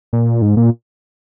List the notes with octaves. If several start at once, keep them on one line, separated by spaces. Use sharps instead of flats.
A#2
G#2
A#2